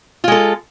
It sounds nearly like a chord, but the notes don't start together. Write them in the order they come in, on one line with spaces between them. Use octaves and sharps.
F4 G#3 A4